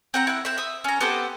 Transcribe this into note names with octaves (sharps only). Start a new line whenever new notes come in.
C4 F#5 A#5
E4 F#5
C4 E5
E5 D#6
C#4 A#5
B3 G4 A4 C5